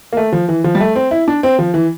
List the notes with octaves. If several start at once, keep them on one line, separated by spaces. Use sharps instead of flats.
A#3
A3
F3
E3
F3
G3
A3
C4
E4
D4
C4
F3
E3